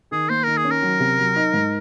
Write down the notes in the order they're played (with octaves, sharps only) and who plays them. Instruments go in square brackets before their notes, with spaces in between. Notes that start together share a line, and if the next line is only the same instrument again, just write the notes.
[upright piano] D#3 [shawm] G#4
[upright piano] A#3 [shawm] C5
[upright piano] D#3 [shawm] A#4
[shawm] G#4
[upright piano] C#4
[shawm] A#4
[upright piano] F#3
C3
F#3
D#4
G#2